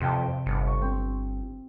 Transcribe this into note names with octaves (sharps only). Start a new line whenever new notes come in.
F2 C3 G5 A5
G1
C#6
C4